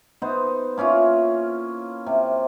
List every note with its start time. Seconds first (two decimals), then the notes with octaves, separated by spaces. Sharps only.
0.22 B3 D#4 C5
0.77 A#3 C#4 E4 F4
2.06 C3